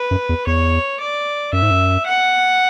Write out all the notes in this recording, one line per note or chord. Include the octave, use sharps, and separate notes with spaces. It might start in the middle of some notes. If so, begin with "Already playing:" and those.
Already playing: B4
F#2
E2
E2 C#5
D5
F#2 E5
G#2
F#2
F#5